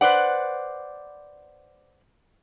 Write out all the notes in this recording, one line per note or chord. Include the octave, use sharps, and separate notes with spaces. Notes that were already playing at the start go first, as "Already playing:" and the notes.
B4 C5 D5 F#5